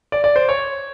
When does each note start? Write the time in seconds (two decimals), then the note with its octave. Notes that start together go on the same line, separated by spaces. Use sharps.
0.12 D5
0.24 D5
0.36 C5
0.49 C#5